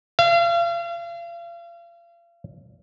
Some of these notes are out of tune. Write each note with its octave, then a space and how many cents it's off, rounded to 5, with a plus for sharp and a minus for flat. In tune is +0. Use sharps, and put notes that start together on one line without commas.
F5 -35